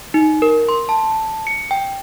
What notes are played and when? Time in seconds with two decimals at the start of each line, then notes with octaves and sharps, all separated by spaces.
0.14 D#4
0.42 A#4
0.69 C6
0.89 A5
1.47 C#7
1.71 G5